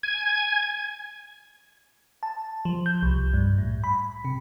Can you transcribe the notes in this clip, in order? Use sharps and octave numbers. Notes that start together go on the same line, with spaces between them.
G#5 G#6
A5
F3
G6
C2
G2
A2
B5
C3